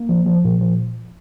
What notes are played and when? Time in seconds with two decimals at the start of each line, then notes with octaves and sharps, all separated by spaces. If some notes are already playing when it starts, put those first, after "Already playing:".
Already playing: A#3
0.09 F3
0.26 F3
0.45 A#2
0.61 F3